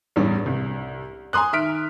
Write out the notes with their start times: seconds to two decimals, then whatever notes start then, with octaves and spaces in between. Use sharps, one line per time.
0.16 A1 E2 G2 G3
0.46 C2
1.33 G#5 A#5 C6 D#6 F#6
1.53 D#3 E5 F6 B6 D7